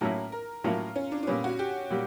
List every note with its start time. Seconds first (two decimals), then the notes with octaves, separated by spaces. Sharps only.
0.01 A2 F#3 A#3 C#4 E4 A#4
0.32 A#4
0.64 A2 F#3 A#3 C#4 E4 F4
0.96 C#4
1.12 D4
1.23 D4
1.27 A#2 G3 B3 C#4
1.44 F#4
1.59 G4
1.91 A#2 G3